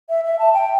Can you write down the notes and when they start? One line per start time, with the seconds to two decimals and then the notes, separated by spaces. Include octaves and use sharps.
0.09 E5
0.24 E5
0.39 A5
0.54 G5